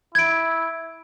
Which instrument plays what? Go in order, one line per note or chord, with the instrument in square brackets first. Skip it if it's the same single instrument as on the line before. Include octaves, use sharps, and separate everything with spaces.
[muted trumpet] E4 [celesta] G#6 D7